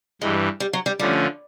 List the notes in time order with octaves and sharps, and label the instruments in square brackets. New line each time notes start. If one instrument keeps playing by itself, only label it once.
[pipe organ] G2 E3 G3 [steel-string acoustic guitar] G#3
[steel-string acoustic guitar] G3
F#3
G3
[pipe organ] D3 F3 A3 C#4 [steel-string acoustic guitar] G3